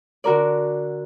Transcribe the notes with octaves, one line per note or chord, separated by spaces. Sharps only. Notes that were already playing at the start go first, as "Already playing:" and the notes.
D3 F#4 A#4 D5